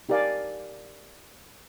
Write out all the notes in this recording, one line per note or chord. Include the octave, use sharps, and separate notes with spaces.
D#4 G4 A#4 D5 F5 G#5